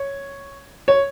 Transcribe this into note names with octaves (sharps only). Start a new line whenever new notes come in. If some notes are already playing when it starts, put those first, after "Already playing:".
Already playing: C#5
C#5